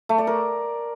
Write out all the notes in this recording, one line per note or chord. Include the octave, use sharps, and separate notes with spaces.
A3
D5
A#4